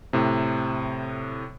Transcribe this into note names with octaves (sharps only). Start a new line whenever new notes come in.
A2 C3